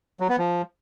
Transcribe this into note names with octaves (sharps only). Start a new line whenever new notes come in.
F#3
B3
F3